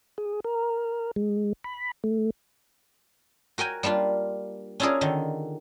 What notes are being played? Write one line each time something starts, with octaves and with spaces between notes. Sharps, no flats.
G#4
A#4
G#3
B5
A3
F#4 A#4 G5 G#5
G3 A#3 D4 F4
C#4 D4 E4 F4 G#4 A#4
D3 D#3